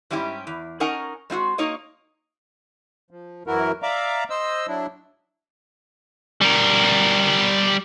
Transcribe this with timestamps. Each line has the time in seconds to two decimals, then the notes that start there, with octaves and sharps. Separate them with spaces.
0.10 G#2 G3 C#4 E4 G4
0.47 E2
0.80 C#4 D#4 A#4 F#5 G#5
1.30 G#3 C4 F4 F#4
1.58 A#3 D#4 C#5 D#5
3.11 F3
3.47 F#2 E3 E4 F#4 A#4
3.83 D5 E5 F5 A#5 D6
4.30 C5 D#5 E6
4.68 F#3 D4 E4
6.41 G3 A#4